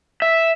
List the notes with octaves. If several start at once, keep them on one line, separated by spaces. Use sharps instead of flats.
E5